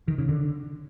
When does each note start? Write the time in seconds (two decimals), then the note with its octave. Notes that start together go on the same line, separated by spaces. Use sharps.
0.08 D#3
0.18 C#3
0.29 D3